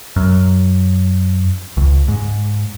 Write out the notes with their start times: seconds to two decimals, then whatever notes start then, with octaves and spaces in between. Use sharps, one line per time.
0.16 F#2
1.77 C#2
2.08 G#2